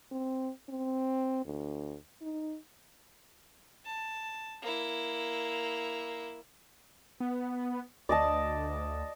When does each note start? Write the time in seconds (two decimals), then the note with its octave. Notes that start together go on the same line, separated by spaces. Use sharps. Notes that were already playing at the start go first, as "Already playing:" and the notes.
0.12 C4
0.69 C4
1.45 D2
2.22 D#4
3.85 A5
4.62 A#3 E4
7.20 B3
8.09 D2 D5 D#5 A5